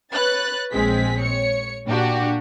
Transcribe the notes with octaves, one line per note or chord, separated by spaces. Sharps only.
B4 C#5 F#6 A6
A#1 G#3 C4 G#4 B6
C#5 C#7
A#2 D4 F#4 G4